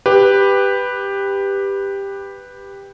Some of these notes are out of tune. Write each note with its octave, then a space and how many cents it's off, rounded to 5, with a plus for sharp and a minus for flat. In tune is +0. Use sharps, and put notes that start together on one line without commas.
G4 +10 B4 +0